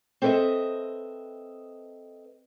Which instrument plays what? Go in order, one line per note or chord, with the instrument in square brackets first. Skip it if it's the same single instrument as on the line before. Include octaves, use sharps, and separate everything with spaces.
[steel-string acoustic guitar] C4 A4 B4 C#5 D#5 E5